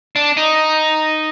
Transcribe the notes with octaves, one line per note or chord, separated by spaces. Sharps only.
D4
D#4